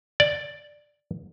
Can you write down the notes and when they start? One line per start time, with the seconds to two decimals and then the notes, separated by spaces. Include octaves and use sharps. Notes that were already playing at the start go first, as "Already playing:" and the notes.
0.20 D5